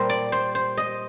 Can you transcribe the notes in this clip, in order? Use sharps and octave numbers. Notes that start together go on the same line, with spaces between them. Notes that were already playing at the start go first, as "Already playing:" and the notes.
Already playing: A#2 G3 A#4 C5
D5
C5
C5
D#5